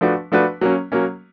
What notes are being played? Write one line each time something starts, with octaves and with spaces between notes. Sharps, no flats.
F3 A3 D4 F#4 B4
F3 A3 D4 F#4 B4
F#3 A#3 C#4
F#3 A#3 C#4